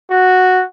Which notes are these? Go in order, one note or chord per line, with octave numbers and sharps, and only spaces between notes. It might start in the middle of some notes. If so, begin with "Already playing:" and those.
F#4